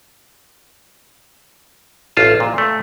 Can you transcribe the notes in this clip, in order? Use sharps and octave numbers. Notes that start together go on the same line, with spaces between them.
A1 F4 A5
A#2
A3